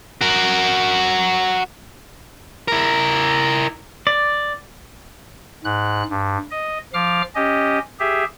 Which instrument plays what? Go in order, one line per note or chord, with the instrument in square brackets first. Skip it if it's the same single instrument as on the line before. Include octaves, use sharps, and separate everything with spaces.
[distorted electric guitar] F#4 A#4
[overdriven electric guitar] E4 A#4
[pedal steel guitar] D5
[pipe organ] G#2 F#6
G2
D#5
F3 F5 D6 F6
C#4 G4 D#5
G4 G#4 E5